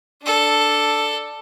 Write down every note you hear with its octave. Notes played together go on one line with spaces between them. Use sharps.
D4 A4